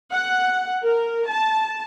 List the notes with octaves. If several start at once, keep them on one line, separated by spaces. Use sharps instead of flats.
F#5
A#4
A5